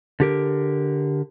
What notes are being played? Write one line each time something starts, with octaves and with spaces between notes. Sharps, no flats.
D3 G4 A#4